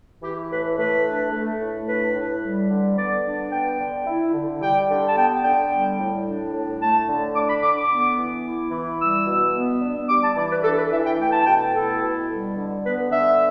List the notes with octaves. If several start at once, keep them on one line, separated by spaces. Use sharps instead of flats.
E3 G4
A2 B4
A3 B4
D4
A3
A2
D4 B4
A2
G3
D3
B3 D5
D4
B3 G5
D3
E4
D3
G3 G5
D3
A5
B3 G5
D3 G5
G3
A2
D4
A2
A3 A5
D3
D4 D6
B5
D3 D6
D6
B3
E3
E4
E3
G3 E6
B2
B3
D4
G3 D6
A5
E3 D5
B4
D4 A4
B4
E3 E5
G5
A3 G5
A5
B2 G5
E4 A4
B2
G3
D3
B3 B4
D3 E5